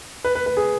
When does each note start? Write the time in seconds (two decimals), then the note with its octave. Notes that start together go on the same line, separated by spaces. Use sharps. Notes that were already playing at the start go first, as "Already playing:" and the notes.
0.24 B4
0.35 B4
0.46 B4
0.57 G#4